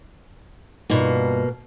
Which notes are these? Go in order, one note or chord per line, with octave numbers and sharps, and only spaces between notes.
G2 B2 A#3 D#4 F4